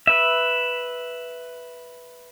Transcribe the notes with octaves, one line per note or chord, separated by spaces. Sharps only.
B4 E5